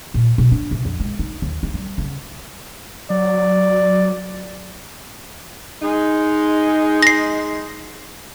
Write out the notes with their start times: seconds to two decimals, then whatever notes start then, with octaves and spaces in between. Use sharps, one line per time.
0.14 A#2
0.38 B2
0.52 D4
0.71 C3
0.85 F2
1.00 G#3
1.19 D#4
1.42 D#2
1.63 F4
1.74 G3
1.98 C#3
3.10 F#3 D5
5.82 G#3 D#4
7.03 A#6 C7